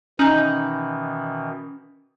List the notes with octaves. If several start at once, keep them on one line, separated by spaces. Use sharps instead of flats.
B2 D#3 E3 C#4 D#4 G#5 G6 F#7